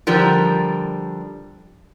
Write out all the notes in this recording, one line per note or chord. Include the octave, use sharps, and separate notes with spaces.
D3 F3 G3 A#4